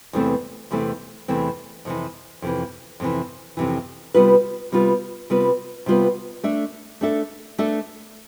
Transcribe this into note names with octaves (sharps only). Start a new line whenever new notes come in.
E2 C3 E3 A3 C4
E2 C3 E3 A3 C4
E2 C3 E3 A3 C4
F2 C3 E3
F2 C3 E3
F2 C3 E3
F2 C3 E3
C3 G3 B3 F4 B4
C3 G3 B3 F4 B4
C3 G3 B3 F4 B4
C3 G3 B3 F4 B4
A3 D4 A4 E5
A3 D4 A4 E5
A3 D4 A4 E5